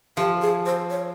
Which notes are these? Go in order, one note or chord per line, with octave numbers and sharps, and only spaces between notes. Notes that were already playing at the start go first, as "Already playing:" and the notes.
F3 G4
G#4
C5
C#5